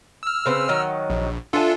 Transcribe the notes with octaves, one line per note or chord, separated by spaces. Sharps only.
E6 F6
C#3 C4 B4
D#3 F#3 D#5
A#1
D4 F4 A4 E5 G#5